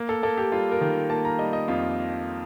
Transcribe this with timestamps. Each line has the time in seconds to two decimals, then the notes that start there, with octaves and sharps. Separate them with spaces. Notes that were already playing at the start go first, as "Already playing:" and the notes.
Already playing: A#3
0.09 A4
0.23 A#3 A4
0.37 G4
0.52 G3 F4
0.72 A#4
0.81 D#3
1.10 A#3 A5
1.25 A#5
1.39 G3 D#5
1.53 D#5
1.68 F2 F4